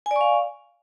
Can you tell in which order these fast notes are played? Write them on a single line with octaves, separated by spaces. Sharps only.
G#5 D5 C#6 F5